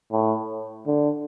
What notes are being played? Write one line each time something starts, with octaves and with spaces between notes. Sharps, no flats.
A2
D3